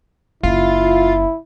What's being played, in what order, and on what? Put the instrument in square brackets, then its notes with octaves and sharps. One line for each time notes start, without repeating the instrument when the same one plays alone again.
[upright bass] F#1 [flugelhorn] E4 [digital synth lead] F4